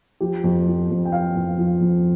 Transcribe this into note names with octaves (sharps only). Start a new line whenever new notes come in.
F3 G4
F2
F3
F2
G5
F3 F5
F2
F3
F2